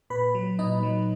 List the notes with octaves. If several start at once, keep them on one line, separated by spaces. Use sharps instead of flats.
A#2 B4 B5
F#3
A#2 D#4 D#5
F#3